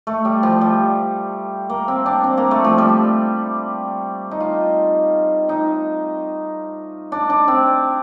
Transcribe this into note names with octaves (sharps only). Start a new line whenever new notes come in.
A3
G3
F3
G3
A#3
C4
D4
C4
A#3
A3
F3
G3
D#4
F4
D#4
D4
D4
C4